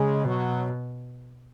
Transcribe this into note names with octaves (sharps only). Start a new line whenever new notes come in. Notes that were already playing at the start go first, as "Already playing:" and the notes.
Already playing: C#3 G#3
B2 F#3